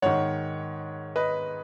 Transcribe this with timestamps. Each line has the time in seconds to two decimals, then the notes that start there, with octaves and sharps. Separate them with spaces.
0.02 G#2 D#3 C#5 F#5
1.16 B4 D#5